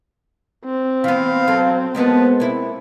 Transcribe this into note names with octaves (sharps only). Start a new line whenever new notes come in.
C4
E3 B3 F5
F#3 A4
F3 G#3 A#3 B3
A#3 C4 E4